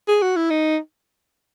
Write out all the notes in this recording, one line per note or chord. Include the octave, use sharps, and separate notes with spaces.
G#4
F#4
E4
D#4